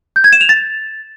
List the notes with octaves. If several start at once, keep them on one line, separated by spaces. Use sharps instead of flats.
G6
G#6
E7
F7
A6